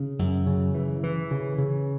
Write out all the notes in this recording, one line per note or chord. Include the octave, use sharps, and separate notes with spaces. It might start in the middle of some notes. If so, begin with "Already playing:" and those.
Already playing: C#3
F#2
C#3
E3
E3
C#3
C#3